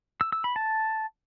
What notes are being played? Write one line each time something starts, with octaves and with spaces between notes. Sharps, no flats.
E6
E6
B5
A5